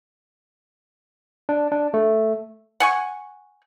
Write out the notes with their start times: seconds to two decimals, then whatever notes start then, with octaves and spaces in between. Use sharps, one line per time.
1.49 D4
1.72 D4
1.94 A3
2.80 F#5 G#5 C#6